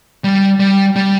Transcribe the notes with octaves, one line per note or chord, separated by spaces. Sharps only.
G3
G3
G3